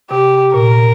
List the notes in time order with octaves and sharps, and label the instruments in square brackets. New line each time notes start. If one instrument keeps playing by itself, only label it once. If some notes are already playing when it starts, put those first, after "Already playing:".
[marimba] C3 [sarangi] G4
[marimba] A#2 [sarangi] A#4